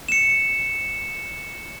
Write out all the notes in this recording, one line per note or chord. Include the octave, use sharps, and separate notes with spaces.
C#7 E7